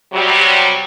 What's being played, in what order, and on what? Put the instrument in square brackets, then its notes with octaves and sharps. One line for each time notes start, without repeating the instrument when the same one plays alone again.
[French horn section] C3 F#3 G3